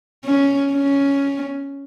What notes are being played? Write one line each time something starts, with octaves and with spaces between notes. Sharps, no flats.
C#4
C#4